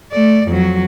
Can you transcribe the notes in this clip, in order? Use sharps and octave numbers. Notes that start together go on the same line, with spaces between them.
A3 D5
F2 F#3